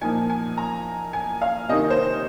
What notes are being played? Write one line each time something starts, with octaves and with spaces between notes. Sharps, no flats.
A#2 F3 A#3 D#4 G#5
G#5
A#5
G#5
F5
C3 D#3 A#3 D#4 D#5
C5